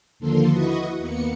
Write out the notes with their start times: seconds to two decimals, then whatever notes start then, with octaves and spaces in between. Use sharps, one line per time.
0.19 D#2 D3 F3 A#3 A4 C6
0.50 E4 F#4 B4 D#5 C#6 D#6
0.99 D#2 A#3 B3 C#7